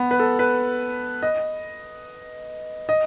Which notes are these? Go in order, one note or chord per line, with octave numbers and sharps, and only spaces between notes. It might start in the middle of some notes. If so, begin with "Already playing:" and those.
Already playing: B3
B4
A4
B4
D#5
D#5